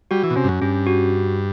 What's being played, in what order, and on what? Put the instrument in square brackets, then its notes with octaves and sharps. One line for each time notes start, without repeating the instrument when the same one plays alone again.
[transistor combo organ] G3 [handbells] F#4
[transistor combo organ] E3
B2
[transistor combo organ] C3 [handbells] C#4
[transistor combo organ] G2
F#2
[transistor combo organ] G2 [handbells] C#4
[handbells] F#4